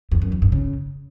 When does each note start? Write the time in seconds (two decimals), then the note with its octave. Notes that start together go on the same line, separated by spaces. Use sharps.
0.12 E2
0.22 F#2
0.32 D#3
0.42 G2
0.52 C#3